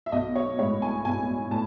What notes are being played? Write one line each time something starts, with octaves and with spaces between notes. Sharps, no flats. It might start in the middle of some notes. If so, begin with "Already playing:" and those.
E5
B1 D#5
C#5
A2 G#3 C#5
G#5
B1 G#5
A2 A5